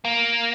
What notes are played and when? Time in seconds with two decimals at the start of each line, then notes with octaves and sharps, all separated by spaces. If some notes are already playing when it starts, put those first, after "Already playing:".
0.05 A#3